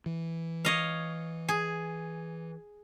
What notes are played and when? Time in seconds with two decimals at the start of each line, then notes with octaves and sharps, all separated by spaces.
0.06 E3
0.65 C#5 D#5 F5
1.48 G#4